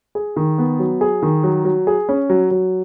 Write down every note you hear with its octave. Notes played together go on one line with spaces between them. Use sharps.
G#4
D#3
B3
F#3
G#4
D#3
F#3
F#3
G#4
C#4
F#3
F#3